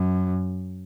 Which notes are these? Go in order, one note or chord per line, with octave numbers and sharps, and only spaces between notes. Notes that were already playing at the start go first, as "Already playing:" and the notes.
Already playing: F#2